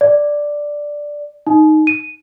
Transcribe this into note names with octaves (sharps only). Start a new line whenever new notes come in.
D5
D#4
D#7